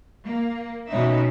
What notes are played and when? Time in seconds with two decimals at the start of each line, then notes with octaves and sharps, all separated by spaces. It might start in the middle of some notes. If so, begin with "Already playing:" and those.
0.24 A#3
0.87 B2 C#4 D#4 E5